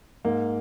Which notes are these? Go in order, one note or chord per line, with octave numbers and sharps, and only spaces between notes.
G#2 A#3